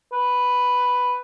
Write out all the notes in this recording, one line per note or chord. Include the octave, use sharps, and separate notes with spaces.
B4